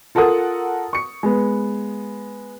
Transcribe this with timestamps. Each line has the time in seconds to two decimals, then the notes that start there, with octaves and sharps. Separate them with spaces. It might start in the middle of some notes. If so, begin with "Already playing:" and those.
0.15 F4 A4 A#4 F#5 D#6
0.93 C#6 C#7
1.23 G#3 B3